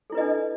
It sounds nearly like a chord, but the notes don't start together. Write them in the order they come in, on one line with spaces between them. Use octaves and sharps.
A4 E4 B4 D#5 D4